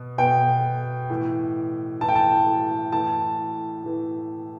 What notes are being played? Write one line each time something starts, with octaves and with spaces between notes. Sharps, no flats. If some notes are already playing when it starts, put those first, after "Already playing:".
Already playing: B2
B2 G5
A2 E3
A2 E3 A5
G5
A5
A2 E3 A5
A2 E3